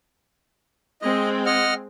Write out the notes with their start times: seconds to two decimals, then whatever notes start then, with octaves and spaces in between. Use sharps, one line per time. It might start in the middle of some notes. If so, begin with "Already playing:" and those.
1.02 G#3 C4 D#5
1.46 D#5 F#5 F6